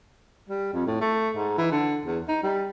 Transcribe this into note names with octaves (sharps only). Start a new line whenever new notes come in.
G3
F2
A2
A3
G#2
E3
D3
E2
D#4
G3